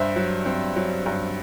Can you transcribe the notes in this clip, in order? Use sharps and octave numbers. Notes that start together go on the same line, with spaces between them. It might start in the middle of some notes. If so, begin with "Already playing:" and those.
Already playing: G2 C5 E5
F#3
C4
F#3
G2